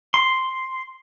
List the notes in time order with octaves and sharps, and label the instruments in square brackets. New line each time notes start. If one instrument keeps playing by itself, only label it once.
[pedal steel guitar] C6